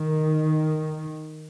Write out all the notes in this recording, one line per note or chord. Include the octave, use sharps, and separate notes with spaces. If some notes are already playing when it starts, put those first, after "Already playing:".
Already playing: D#3